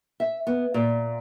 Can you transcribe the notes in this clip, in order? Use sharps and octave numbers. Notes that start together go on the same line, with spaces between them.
E5
B3
A#2